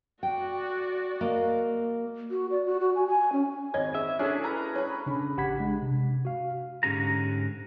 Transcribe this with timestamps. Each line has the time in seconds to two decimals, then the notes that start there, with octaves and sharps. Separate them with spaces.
0.23 F#4 D5 G5
1.21 A#3 D#5
2.31 F#4
2.51 D5
2.66 F#4
2.80 F#4
2.95 G#5
3.07 G#5
3.33 C#4
3.74 G#1 C#5 D#5 G#6
3.95 G#4 E5
4.19 C#4 D4 E4 G#4 A4 C#5 B6
4.44 B4 A#5
4.75 B4 C#5 B5
5.06 C#3 C#4 D4
5.37 A1 G4 F#5 B5 G#6 B6
5.59 G#3 D4
5.82 C3
6.25 F#4 F5
6.83 G#2 D3 C#4 G4 G#4 A#5